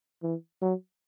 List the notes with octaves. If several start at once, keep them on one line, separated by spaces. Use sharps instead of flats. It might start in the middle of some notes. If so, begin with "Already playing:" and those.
E3
F#3